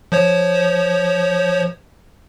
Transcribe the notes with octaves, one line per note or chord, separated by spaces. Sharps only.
F3 C5 C#5